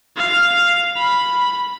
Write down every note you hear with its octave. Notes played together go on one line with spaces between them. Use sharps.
F5
B5